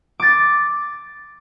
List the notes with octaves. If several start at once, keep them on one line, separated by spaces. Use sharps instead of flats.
D6 A6